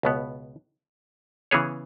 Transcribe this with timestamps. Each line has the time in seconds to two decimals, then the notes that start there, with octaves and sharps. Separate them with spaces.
0.03 C#2 B2 B3
1.51 C#3 E3 B3 G#4 C#5